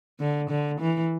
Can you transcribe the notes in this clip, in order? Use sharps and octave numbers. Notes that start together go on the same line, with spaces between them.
D3
D3
E3